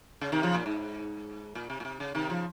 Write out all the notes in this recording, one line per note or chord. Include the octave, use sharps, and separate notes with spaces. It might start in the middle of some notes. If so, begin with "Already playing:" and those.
C#3
C3 D#3
C#3 F3
A#2
G#2
A#2
C3
A#2
C3
C#3
C3 D#3
C#3 F3